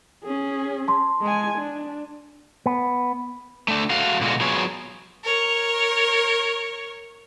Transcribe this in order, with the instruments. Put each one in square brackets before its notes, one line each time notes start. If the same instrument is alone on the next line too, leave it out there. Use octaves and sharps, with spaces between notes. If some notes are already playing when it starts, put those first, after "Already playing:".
[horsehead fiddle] C#4 G#4
[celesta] A5 C6
[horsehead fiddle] G#3 G#5
D4
[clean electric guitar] B3
[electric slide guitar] A3 D4
A3 F#4 F5
B2 D3 G#3 F4 F#4
F#3 B3 F4 G#4 C#5
[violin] A#4 C#5